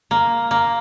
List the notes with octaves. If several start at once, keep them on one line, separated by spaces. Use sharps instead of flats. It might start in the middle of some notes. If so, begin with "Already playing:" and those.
A#3
A#3